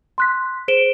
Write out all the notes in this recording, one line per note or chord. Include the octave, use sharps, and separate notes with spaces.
C6 F#6 B6
G#4 C5 D7 E7 G7